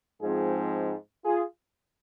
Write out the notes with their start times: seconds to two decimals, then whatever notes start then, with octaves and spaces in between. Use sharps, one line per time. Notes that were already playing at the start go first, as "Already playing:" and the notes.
0.21 G#2 F3 G#3 C4 F4 G#4
1.25 F4 G#4